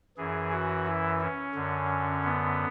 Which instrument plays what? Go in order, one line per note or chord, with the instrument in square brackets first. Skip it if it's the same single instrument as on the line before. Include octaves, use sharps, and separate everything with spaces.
[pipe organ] F#2 E3 G#4
F#4
E4
C#4
F#2 D3
B3